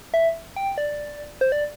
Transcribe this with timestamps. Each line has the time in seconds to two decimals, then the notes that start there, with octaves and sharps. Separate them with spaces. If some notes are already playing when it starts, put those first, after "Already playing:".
0.14 E5
0.56 G5
0.78 D5
1.41 C5
1.52 D5